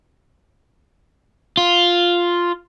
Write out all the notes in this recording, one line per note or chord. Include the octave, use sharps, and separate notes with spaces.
F4